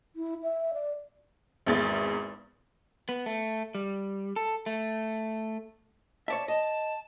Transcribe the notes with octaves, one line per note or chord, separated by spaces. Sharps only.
E4
E5
D5
G#1 E2 A6
B3
A3
G3
A4
A3
C#5 D5 E5 A5
D#5 A5